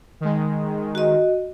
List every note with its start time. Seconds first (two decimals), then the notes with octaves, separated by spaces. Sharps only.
0.21 D#3 G#3
0.95 F#4 D#5